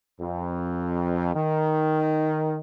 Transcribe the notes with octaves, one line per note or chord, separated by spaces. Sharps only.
F2
D#3